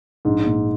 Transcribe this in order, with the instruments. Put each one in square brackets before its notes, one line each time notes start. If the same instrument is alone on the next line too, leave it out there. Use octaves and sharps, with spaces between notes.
[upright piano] A#1 [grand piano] G#2
[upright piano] A#2